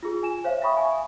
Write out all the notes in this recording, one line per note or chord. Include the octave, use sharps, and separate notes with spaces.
F4 G#4
G#5 E7
C5 C#5 E5 F5
E5 F5 G5 B5 C#6 D#6
G#5